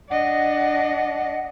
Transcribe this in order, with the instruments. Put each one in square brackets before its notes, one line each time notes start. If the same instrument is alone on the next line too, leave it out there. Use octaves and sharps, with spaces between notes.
[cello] D4 D#5 [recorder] F#5